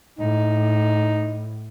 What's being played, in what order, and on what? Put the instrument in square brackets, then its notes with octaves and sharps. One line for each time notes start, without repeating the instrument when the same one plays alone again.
[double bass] A2 [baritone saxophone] D#4